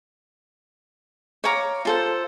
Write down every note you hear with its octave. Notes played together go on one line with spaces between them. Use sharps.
C#5 F5 A#5 D6
F4 A4 C5